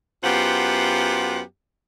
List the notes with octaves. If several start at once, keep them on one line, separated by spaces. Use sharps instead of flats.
F#2 B3 F4 G4 C5 F#5